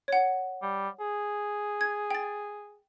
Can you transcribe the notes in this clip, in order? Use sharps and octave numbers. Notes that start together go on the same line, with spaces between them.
C#5 F#5
G3
G#4
G#6
G5 A6